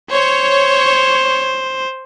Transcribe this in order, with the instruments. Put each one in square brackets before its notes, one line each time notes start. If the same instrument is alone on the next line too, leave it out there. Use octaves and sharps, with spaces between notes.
[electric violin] C5 [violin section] C#5